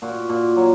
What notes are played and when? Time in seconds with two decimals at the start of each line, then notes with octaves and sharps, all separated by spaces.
0.02 A#2 F#4
0.29 A#2
0.56 F#3